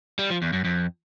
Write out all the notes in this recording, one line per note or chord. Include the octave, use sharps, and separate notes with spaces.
G3
F3
E2
F#2
F2